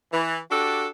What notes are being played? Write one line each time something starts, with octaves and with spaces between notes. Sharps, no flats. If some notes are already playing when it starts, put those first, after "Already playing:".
E3
D4 F#4 G4 A4